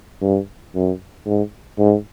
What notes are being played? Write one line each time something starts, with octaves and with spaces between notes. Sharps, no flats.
G2
F#2
G#2
G#2